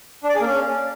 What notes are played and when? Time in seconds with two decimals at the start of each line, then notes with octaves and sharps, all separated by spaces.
0.23 D4
0.29 D5
0.35 G#4
0.41 A#3
0.46 C#4